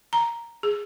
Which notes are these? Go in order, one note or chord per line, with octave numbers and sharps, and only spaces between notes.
A#5
G#4